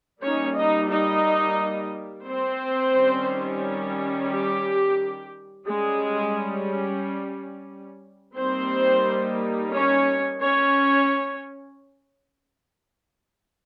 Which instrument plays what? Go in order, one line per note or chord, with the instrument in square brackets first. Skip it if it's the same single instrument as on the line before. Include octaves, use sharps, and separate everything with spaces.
[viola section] G3 A#3 C#4 D#4 C#5
D#4 D#5
D#4 D#5
C4 C5
D#3 G3 C#4
G4
G3 G#3 C#4 G#4
G3 A#3 C4 D#4 C5
C#4 C#5
C#4 C#5